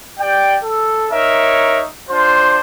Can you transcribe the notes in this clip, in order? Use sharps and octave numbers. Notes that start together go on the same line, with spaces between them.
G4 D5 G5
A4
D#4 A#4 C#5 E5
D4 F4 C5